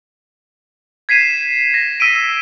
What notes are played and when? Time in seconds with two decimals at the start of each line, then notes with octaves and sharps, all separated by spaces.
1.09 G#6 B6 C7 D#7 E7
1.74 A#6
2.00 E6 B6 D7 D#7